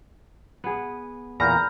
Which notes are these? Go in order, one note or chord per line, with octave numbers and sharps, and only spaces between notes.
B3 G#4
E2 A#2 A#5 B5 F6 G6